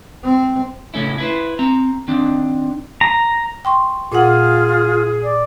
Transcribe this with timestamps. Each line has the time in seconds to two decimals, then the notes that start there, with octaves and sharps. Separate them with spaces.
0.24 C4
0.94 A2 C#3 A3 C#4 E4
1.18 E4 B4 C5
1.59 C4 A#5
2.08 D#3 C4 D4
3.01 A#5
3.65 G5 C6 C#6
4.12 A#2 F4 G#4 F#5
5.23 D5